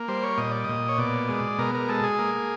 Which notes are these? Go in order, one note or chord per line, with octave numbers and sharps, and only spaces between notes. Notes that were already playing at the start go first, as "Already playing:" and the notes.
Already playing: A#3
G3 C5
C#5
A#2 D#5
D5
A#2 D#5
C#5
B2 D5
G#3
B2 A#4
A#4
G#3 A4
G#4
A#3